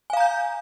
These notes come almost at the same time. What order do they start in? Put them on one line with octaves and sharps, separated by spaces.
G#5 F5 A#5 G6